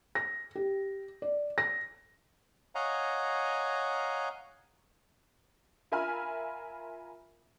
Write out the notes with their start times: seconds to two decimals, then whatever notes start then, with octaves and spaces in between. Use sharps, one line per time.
0.15 A#6
0.55 G4
1.22 D5
1.58 A#6
2.75 C#5 D#5 F5 F#5 G#5 A#5
5.92 F4 A#4 E5 G#5 B5 F6